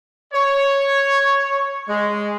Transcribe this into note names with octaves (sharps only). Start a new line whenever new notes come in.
C#5
G#3